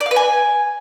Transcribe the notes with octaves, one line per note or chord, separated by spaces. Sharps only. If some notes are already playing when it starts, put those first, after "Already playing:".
D5
F5
B4
G#5